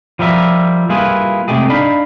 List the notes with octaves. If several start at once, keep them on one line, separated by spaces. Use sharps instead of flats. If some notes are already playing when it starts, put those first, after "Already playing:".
F3 G3 A#4 E5
G3 A#3 E4 F4 G#4 B4
C3 G#3 A3 G4 G#4
D4 D#4 F5 B5